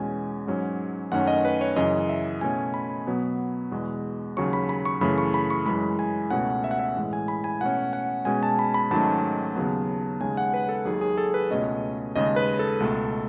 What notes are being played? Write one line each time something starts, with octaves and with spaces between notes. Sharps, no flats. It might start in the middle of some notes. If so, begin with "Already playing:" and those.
Already playing: E2 B2 G#3 C#4 G#5
G#2 F#3 C#4
F#2 D#3 A3 C#4 F#5
D#5
B4
C#5
F#2 C#3 E3 D#5
E5
B2 A3 C#4 G#5
B5
B2 F#3 B3
E2 B2 G#3
D#2 C#3 F#3 C#4 C#6
B5
B5
C#6
F#2 C#3 E3 A3 B5
C#6
B5
C#6
F#2 E3 G#3 B5
G#5
C#2 B2 A3 C#4 F#5
E5
F#5
E5
A2 E3 G#3
G#5
B5
G#5
B2 A3 C#4 F#5
F#5
B2 G#3 C#4 G#5
A5
B5
B5
G#2 D#3 F#3 A3 C#4 A5
D#2 C#3 F#3 B3
D#2 C#3 G#3 G#5
F#5
B4
A4
D#2 D#3 F#3 G#4
G#4
A4
B4
C#2 B2 A3 C#4 D#5
D#2 C#3 G#3 D#5
B4
A4
C#2 B2 A3